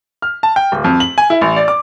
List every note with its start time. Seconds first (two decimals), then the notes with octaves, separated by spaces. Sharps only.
0.22 F6
0.43 A5
0.56 G5
0.72 D1
0.84 F2
1.00 F#7
1.18 G#5
1.30 E4
1.41 A1
1.56 D5
1.68 D6